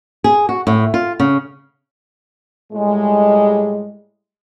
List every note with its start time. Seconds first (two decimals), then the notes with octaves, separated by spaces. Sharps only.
0.24 G#4
0.49 F#4
0.67 A2
0.94 F4
1.20 C#3
2.72 A2 G3 G#3